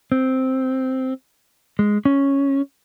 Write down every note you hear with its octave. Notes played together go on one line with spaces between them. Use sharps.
C4
G#3
C#4